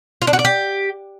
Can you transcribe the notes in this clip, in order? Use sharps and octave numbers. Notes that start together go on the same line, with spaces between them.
F4
D4
F#4
D5
G4